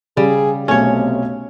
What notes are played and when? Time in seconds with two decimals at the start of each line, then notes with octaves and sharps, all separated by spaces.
0.17 C#3 G3 G#4
0.68 B1 C3 A3 C#4 C#5